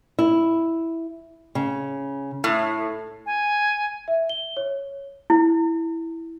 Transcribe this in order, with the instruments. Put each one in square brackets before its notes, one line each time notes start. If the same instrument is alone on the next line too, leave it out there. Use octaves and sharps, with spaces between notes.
[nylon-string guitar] E4
C#3
[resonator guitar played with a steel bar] A2
[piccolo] G#5
[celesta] E5
G7
C#5
[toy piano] E4